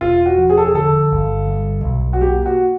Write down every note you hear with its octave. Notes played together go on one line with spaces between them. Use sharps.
E1 F4
F#4
F3
G#4
A4
G#4
D3 A4
G1
G3
B1
F#4
A#3 G4
F#4